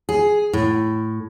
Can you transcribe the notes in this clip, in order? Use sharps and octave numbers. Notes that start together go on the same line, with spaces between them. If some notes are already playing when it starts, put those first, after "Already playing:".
G#4
A2